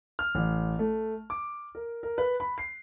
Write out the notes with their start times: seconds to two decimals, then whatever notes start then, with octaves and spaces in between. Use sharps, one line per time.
0.19 F6
0.35 A1
0.79 A3
1.30 D6
1.75 A#4
2.03 A#4
2.18 B4
2.40 B5
2.58 C7